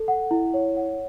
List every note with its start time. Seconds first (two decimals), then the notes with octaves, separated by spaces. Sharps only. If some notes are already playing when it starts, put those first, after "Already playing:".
Already playing: A4
0.08 F#5
0.31 E4
0.54 C#5
0.76 F#5